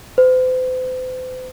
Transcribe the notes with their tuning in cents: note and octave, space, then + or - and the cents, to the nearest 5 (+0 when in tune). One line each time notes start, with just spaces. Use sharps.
C5 -40